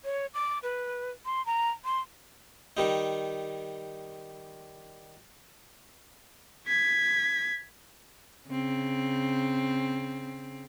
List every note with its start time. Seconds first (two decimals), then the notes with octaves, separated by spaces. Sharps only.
0.04 C#5
0.34 D6
0.63 B4
1.26 C6
1.46 A#5
1.85 C6
2.77 D#3 G3 D#4
6.67 G#6 B6
8.49 C#3 C4